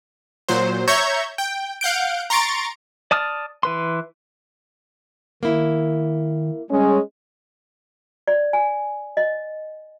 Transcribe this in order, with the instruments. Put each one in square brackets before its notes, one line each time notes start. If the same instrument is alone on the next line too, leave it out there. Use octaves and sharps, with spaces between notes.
[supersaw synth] A#2 F#3 C5
C#5 E5 A#5 C#6 G6 G#6
G5
F5 F#5 G6 D7
A#5 C6 C#6 A6 D7
[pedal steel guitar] D5 A5 D#6 F6
E3 B4 C6
[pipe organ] D#3 [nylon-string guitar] A#3 E4
[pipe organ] G3 [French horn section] G#3 C#4
[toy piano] D5
G#5
D#5